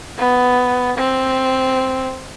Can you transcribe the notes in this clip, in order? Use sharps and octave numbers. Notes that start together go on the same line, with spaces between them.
B3
C4